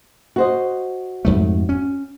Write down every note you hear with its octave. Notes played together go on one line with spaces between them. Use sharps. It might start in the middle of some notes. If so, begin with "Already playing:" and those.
F#4 C5 D#5
F2 G#2 A3
C#4